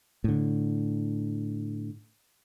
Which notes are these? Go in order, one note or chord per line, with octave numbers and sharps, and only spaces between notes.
A2 D3